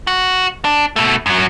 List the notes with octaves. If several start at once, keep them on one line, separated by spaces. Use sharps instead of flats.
F#4
D4
B2 A3
F#2 F#3